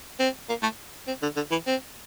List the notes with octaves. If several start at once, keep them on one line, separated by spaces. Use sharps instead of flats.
C4
A#3
A3
C4
D3
D3
E3
C4